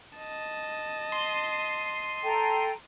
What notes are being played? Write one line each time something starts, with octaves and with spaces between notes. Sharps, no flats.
D#5 A5
C6 D#7
A4 G5 A#5